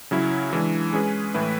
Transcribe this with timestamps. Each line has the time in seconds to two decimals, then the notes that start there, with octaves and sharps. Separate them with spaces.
0.11 C#3 F#3 C#4 E4
0.53 E3 G#3 D4
0.93 G#3 C#4 G#4 B4
1.34 A2 E3 A3 E4 B4